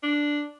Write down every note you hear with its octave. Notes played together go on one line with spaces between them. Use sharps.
D4